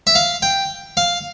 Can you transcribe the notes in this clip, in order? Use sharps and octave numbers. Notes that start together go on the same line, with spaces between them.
E5
F5
G5
F5